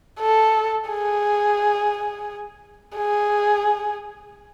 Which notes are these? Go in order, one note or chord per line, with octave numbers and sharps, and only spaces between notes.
A4
G#4
G#4